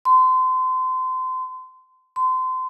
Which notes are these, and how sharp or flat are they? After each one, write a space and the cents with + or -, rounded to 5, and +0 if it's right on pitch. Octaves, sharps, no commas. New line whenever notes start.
C6 -30
C6 -30